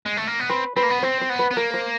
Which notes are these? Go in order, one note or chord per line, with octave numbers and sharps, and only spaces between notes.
G#3
A3
A#3
B3
C4 B4
C4 B4
A#3
B3
C4 C5
C5
B3
B4
B3
A#3 A#4
C5